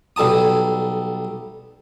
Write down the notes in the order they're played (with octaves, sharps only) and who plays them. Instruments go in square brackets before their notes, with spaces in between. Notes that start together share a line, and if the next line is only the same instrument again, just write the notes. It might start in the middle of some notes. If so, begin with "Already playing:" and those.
[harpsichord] B1 G3 A4 A5 D#6